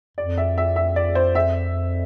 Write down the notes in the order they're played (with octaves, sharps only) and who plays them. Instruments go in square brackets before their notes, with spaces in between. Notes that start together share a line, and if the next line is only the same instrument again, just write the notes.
[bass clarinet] F2 [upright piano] D5
[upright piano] E5
E5
E5
D5
C5
E5